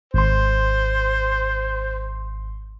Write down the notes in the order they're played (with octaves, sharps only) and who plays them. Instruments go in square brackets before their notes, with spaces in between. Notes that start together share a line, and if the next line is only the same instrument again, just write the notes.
[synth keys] G#1 C6 [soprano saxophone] C5